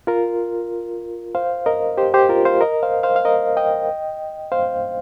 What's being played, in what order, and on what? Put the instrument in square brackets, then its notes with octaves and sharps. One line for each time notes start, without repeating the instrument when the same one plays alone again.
[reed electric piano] F4 A#4
C5 F5
A#4 D#5
G4 C5
G4 C5
F4 A#4
C5 F5
A#4 D#5
C5 F5
C5 F5
F5
A#4 D#5
D#5 G5
C5 F5